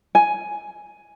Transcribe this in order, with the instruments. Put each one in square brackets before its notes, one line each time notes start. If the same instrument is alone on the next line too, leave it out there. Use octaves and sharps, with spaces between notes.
[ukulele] G#5